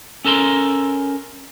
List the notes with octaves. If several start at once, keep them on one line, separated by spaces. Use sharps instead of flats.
C#4 A4 A#4 A5 C6